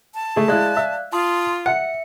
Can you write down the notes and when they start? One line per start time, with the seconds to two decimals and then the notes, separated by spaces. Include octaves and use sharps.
0.14 A5
0.36 A3 G#4
0.48 G#3 E4 D5 F5 F#6
0.77 E5
1.13 F4 A5 C6 D#6
1.66 E5 F#5 C#7